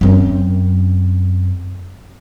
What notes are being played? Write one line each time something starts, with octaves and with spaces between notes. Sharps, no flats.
F#2 C4